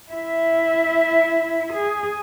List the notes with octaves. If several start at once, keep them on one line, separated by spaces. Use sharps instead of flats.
E4 E5
G#4